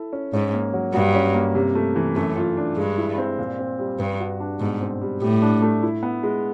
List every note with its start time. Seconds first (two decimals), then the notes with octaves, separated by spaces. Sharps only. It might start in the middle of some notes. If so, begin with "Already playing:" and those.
Already playing: E4 A4
0.13 C#4
0.33 G#2 C#4
0.54 A#3
0.74 F#3
0.94 G2 F#4
1.15 C#4
1.34 A#3
1.55 C3
1.75 A3
1.96 E3
2.16 F#2 A3
2.37 F4
2.57 D4
2.77 G2 G#3
2.98 E4
3.18 C4
3.39 A#2
3.59 C4
3.79 G3
3.99 G2 B4
4.20 F#4
4.40 D4
4.60 G#2 B2
4.81 C4
5.01 G3
5.21 A2 G4
5.42 D4
5.62 A3
5.83 E4
6.03 B3
6.23 G#3